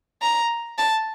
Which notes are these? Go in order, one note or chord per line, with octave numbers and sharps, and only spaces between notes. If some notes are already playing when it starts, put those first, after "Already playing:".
A#5
A5